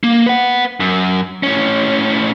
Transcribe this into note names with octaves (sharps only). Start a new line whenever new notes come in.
A#3
B4 F#5
F#2
A2 C#4